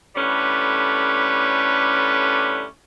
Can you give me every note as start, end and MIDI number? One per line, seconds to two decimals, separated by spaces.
0.16 2.64 45
0.16 2.64 50
0.16 2.64 55
0.16 2.64 61
0.16 2.64 71